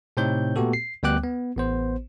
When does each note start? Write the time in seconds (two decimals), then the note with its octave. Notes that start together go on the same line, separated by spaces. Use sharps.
0.17 A2 C3 C4 D#4 C#5 G6
0.56 A#2 A3 B3 F#4 G4 A4
0.73 C7
1.03 D2 G3 B3 G5 D6 F#6
1.24 B3
1.56 A1 B3 C5